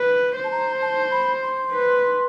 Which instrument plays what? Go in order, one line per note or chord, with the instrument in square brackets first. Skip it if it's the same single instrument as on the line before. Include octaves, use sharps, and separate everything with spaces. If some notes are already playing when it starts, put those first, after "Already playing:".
Already playing: [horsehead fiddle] B4
C5
[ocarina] A5
A#5
A5
B5
C6
[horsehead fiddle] B4